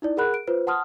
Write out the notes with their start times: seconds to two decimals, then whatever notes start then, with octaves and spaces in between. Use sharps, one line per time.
0.02 D#4 E4 D5
0.17 G#4 A#4 F#5 B5 F#6
0.34 D7
0.47 F4 B4 C5
0.67 F#5 A5 C6 D#6 F6